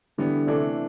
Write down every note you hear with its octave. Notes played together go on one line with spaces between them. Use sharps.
D3 E3 G3 B3
C3 E3 A3 D4 A4